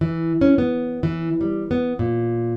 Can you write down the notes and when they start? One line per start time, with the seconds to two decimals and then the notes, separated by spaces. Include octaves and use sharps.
0.01 E3
0.41 C#4
0.58 B3
1.03 E3
1.41 G3
1.71 B3
1.99 A#2